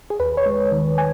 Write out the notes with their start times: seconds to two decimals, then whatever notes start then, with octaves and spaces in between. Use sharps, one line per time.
0.10 G#4
0.20 D#2 B4
0.37 C#5
0.46 G#3
0.72 D#3
0.98 G#5